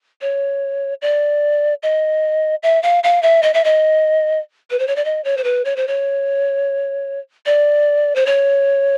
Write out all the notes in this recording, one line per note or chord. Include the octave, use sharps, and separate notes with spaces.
C#5
D5
D#5
E5
F5
F5
E5
D#5
E5
D#5
B4
C5
C#5
D5
D#5
C#5
C5
B4
C#5
C5
C#5
D5
C5
C#5